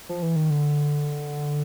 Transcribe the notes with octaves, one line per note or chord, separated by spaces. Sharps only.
F3
E3
D#3
D3